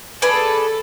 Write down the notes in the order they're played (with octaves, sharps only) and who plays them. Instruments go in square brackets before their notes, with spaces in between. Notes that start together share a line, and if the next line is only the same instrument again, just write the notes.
[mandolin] G#4 B4 D5 [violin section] A4